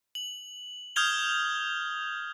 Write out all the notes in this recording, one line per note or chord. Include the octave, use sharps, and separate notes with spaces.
F#7
D#6 F6 G6 G#6 F7 G7